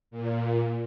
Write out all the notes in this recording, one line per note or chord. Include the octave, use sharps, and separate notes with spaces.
A#2